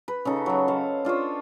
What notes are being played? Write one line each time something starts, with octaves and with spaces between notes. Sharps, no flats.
B4
C#3 D#4 A4
F#3 E5
C5 F5
D4 F4 C5 C#5